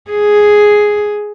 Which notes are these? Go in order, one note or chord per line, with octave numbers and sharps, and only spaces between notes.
G#4